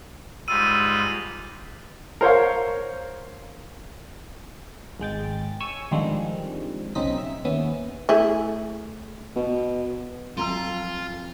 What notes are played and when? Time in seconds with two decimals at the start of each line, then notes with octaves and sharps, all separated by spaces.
0.48 G#2 G3 F4 E6 D#7
2.21 A#4 C5 C#5 F5
5.00 G#1 G#3 G5 A6
5.60 C#5 G#5 C#6 E6 G#6
5.91 D3 D#3 F3 G3 G#3 C4
6.95 B1 C#3 C4 D#4 D#5 B6
7.18 E5
7.45 D#2 B3 C#4 E5 D#6
8.09 A3 E4 G#4
9.36 B2
10.37 F2 F#3 F4 A#5 C6